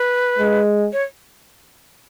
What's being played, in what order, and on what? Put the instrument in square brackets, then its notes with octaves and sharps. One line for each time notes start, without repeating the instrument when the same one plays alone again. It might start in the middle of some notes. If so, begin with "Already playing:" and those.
Already playing: [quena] B4
[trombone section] G#3
[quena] C#5